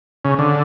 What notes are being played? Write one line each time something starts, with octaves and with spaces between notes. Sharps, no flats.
C#3
D3